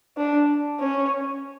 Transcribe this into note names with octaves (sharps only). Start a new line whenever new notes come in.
D4
C#4